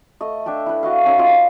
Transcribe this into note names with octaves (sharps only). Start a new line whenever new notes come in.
A3 D#5
D4 E5 G5 A5
E4 B4
F#4 D#5 F5
C#4 D#4 A4 D#5
F4 A#4 D5 D#5